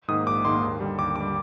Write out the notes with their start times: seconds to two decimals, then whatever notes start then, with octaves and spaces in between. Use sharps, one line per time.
0.08 G#2 D#3 A#3 D#6
0.27 A#1 D6
0.45 G#2 D#3 A#3 C6
0.63 D#2
0.80 D3 G3
0.99 D#2 D6
1.16 D3 G3 D6